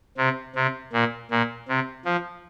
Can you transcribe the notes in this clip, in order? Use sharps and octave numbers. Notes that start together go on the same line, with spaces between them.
C3
C3
A#2
A#2
C3
F3